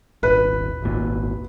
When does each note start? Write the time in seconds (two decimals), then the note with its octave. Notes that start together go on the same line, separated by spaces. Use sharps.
0.23 D#1 G#1 B4
0.82 D#1 G#1 A#2